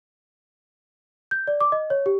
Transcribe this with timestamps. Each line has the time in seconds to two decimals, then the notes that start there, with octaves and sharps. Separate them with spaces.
1.31 G6
1.47 D5
1.61 D6
1.72 D#5
1.90 C#5
2.06 G4